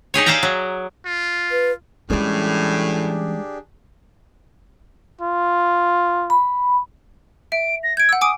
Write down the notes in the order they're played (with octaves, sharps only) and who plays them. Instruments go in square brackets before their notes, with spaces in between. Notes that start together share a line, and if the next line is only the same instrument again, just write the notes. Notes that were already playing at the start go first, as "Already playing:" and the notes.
[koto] D#4 G4 G#4 C#5
G#4 D5 E5 F5 G5 A#5
F#3
[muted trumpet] F4
[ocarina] B4
[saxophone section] A2 [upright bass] E3 C#4 [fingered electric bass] G3 G#3 [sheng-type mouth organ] D4 G4 G#4
[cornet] F4
[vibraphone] B5
[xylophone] E5 [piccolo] D7
[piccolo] A#6
[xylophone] G6 D7 [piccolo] G#6
[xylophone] F#5 E6
[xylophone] G#5 D6 D7 [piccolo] D#6